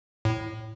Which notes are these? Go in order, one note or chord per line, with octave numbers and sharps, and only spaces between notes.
A2